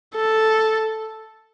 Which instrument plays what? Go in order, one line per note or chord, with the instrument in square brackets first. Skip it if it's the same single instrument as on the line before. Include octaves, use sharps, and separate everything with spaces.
[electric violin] A4